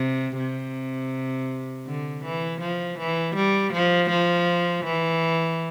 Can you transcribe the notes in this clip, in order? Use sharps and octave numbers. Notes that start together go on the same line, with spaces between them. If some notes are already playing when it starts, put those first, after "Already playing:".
Already playing: C3
C3
D3
E3
F3
E3
G3
F3
F3
E3